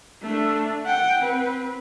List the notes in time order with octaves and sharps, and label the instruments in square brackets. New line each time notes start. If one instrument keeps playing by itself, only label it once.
[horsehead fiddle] A3 D4
F#5 G5
C4 B4